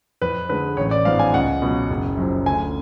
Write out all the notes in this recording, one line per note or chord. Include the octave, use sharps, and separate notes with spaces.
F2 B4
D3 G#3 B4
A1 C#5
D5
G#2 F3 B3 F5
G#5
C#2 F#5
B2 F#3
F#1
F#2 F3
D2 G#5